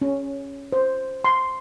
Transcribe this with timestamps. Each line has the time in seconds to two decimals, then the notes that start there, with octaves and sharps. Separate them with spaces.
0.02 C#4
0.72 C5
1.24 C6